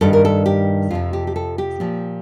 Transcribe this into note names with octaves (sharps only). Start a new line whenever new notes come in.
G2 D#3 G3 A4
A#4
A4
G4
F2 C3 F3 F4
G4
G4
A4
G4
A#2 F3